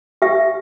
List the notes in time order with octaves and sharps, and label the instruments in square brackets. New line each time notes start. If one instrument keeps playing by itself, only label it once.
[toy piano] G4 E5